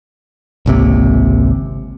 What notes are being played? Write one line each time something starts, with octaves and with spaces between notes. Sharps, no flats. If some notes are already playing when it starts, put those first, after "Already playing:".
G#1 C#2 C3 A#3